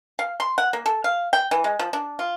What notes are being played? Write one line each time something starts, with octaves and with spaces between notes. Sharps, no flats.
F5
C6
F#5
A#3
A4
F5
G5
E3
G#3
F3
D4
F4